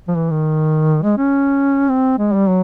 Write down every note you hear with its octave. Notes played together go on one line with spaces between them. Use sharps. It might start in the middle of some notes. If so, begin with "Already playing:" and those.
F3
E3
D#3
G#3
C#4
C4
G#3
G3
F#3